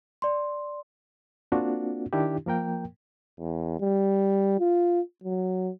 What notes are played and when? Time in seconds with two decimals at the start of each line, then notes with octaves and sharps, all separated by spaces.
0.22 D5 C6
1.52 A#3 C4 D4 F4 F#4
2.13 D#3 D4 E4 G4
2.46 F3 A#3 A#4 G5
3.40 E2
3.80 G3
4.60 F4
5.24 F#3